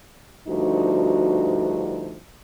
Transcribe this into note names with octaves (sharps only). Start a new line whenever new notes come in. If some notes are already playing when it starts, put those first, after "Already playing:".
D2 G2 F3 D#4 F#4